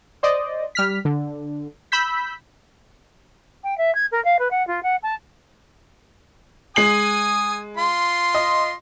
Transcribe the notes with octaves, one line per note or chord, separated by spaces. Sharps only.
C5 D5 D#5
G3 F6 B6
D3
B5 E6 G6 B6
G5
E5
G#6
A#4
F5
B4
F#5
F4
F#5
A5
G#3 G#5 D#6 C7 F#7
F4 C6
D#5